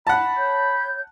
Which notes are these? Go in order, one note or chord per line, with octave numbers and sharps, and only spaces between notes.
F#5 A5 B5
C#5 G6